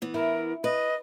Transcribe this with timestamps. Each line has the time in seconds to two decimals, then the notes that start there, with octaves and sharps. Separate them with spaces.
0.02 E3 B3
0.14 E4 A#4
0.64 B4 D#5